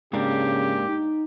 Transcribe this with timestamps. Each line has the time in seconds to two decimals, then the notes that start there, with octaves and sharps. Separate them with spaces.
0.13 G#2 C#3 A#3 D4 G4
0.89 D#4